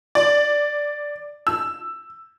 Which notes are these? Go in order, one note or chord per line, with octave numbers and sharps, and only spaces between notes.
D5
E6